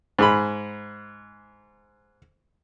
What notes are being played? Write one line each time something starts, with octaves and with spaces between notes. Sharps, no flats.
G#2 G#4 B5